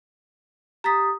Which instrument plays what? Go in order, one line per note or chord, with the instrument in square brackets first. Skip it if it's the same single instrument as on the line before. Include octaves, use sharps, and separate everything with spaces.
[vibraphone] G4 D#6 [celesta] A#5 A6 B6